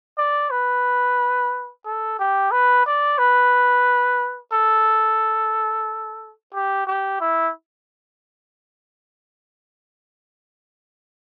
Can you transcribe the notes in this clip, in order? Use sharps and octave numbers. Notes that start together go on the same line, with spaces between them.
D5
B4
A4
G4
B4
D5
B4
A4
G4
G4
E4